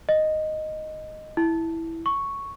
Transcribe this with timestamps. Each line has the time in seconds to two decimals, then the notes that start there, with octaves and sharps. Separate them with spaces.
0.09 D#5
1.37 E4
2.06 C#6